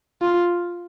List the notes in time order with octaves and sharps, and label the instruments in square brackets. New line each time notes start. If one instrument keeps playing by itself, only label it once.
[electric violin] F4